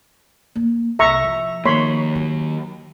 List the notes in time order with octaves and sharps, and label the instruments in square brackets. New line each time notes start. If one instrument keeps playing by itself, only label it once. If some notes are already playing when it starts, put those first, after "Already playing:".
[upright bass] A#3
[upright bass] C2 C3 [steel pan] E5 A#5 C#6
[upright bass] F3
[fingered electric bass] D#3 A#3 [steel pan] C#5 B5 C6
[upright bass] F#3